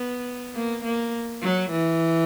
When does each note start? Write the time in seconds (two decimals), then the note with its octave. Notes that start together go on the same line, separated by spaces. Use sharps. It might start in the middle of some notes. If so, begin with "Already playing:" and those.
Already playing: B3
0.55 A#3
0.84 A#3
1.43 F#3
1.71 E3